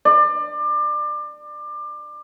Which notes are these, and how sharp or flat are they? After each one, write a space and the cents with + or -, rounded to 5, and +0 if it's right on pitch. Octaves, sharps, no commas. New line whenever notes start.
D5 +25